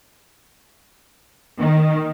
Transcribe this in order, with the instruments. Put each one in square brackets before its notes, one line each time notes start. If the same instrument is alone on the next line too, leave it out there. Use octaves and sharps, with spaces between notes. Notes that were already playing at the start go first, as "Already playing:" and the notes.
[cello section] D#3